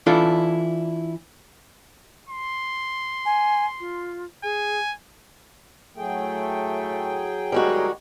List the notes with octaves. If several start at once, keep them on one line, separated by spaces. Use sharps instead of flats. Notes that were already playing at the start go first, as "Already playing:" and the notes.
E3 D4 E4 F4 A4 D5
C6
G#5
F4
G#4 G#5
A2 F#3 A3 G#4 G5
A2 D#3 G3 G#3 F#4 A#4